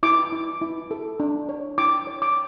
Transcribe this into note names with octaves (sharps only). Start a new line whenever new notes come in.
E4 D6
E4
E4
A4
D4
C#5
E4 D6
C#5
D6